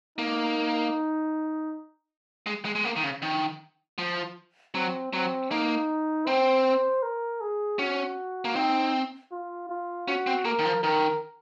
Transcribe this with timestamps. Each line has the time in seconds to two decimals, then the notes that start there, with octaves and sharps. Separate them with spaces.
0.18 A#3 D#4
2.46 G#3
2.65 G#3
2.75 G#3
2.85 A#3
2.96 D#3
3.03 C#3
3.22 D#3
3.98 F3
4.75 F#3 C4
5.12 F#3 C4
5.51 A#3 D#4
6.27 C4 C5
7.03 A#4
7.41 G#4
7.79 C#4 F#4
8.45 A#3
8.55 C4 D#4
9.32 F4
9.69 F4
10.07 C#4 F#4
10.27 C4
10.45 A#3 A#4
10.59 D#3
10.65 F3
10.83 D#3 A#4